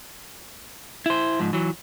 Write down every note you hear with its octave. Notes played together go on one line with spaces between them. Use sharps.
E4 C5
G#2 F3
E3 F#3